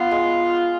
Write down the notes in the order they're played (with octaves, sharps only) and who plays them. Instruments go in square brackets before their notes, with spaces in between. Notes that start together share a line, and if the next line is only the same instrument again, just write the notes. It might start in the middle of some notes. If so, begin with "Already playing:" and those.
Already playing: [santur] B3 [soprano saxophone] F4
[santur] G#3